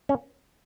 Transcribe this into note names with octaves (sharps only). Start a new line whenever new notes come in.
C#4